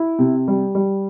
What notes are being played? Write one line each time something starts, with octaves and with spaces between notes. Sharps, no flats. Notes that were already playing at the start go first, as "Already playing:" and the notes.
Already playing: E4
C3
G3
G3